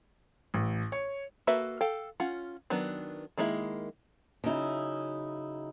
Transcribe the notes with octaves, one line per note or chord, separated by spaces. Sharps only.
A1
C#5
A#3 F#4 A4 B4 E5
A4 F5 G5
C#4 F4 F#5
D#3 F#3 B3 D4
D#3 G#3 A#3 E4
C#3 F#3 D#4 E4